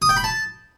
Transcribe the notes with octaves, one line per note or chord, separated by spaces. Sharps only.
D#6
G5
B5
A5